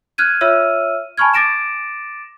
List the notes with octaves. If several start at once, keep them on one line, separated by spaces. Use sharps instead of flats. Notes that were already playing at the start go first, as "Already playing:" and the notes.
F6 F#6 G#6 D#7
F4 C#5 E5 E6 F6 D#7
G#5 A5 B5 C#6 F6 G#6
D6 A6 A#6 D7 E7